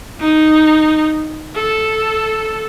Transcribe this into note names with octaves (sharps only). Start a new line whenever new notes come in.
D#4
A4